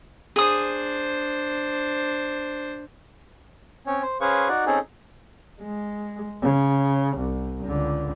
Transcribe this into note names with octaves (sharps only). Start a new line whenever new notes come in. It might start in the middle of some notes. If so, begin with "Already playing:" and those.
D4 G#4 C5 D#6
C4 C#4 C#5
C5
C#4 G#4 B4 C5 F5 C#6
D#4 F#4 D5 F#5
C4 C#4 D#4 G#4 A4
G#3
C#3
C2
C#2 D3